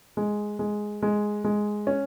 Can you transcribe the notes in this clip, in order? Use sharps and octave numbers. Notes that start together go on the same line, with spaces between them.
G#3
G#3
G#3
G#3
C#4